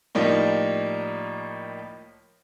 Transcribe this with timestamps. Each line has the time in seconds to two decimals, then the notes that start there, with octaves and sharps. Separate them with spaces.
0.15 A2 F3 G3 A#3 D#4